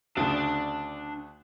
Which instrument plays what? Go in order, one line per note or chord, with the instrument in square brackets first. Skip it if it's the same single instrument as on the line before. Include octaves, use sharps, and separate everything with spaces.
[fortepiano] D2 C#3 [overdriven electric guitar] D4 A5